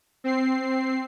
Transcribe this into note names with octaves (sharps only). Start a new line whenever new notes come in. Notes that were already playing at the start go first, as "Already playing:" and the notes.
C4 C7